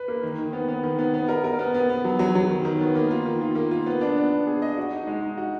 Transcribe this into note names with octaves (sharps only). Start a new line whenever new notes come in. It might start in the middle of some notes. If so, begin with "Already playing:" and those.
Already playing: B4
A#3
D#3
D#3
B3
B3
D#3
B3
B3
A#4
A#4
B3
B3
B3
F#3
F#3
F#3
D#3
D#3
B3
A#3
F4
D#3
F4
A#3
F4
B3
D4
B3
B3
G#4
D#5
F#4
D#4
G#3
D#4
F#4